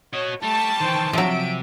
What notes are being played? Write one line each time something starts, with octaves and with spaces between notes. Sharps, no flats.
F#4 C#5 D#5
G3 A3 A5 C#6
D#3 E3 C5 G5
C3 F3 F#3 E5 D7